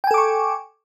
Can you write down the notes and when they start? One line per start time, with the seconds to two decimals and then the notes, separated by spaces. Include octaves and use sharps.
0.04 G5
0.07 G#5
0.11 A4
0.14 D6
0.18 C#6